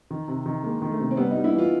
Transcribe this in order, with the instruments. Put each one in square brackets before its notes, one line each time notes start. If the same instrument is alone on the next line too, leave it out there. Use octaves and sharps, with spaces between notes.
[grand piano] D#3
C3
D#3
[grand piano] G#3 [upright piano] A#3
[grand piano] D#3
[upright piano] A3
[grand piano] C3
[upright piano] C4
[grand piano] G3 [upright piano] B3
[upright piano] D#4
[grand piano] G3
[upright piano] E4
[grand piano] E3
[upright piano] F4